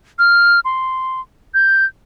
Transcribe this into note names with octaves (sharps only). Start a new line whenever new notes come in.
F6
C6
G6